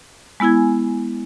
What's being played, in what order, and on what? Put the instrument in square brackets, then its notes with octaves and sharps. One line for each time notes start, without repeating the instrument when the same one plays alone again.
[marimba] G#3 B3 E4 G#5 G#6